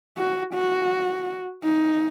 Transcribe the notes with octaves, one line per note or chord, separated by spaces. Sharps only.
F#4
F#4
D#4